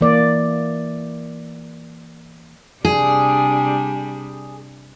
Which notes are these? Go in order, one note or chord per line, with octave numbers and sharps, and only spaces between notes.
E3 A#3 D5
C3 G3 D4 G#4